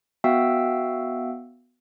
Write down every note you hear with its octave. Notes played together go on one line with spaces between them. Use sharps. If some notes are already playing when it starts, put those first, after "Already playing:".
B3 F#4 E5 F5 G5 E6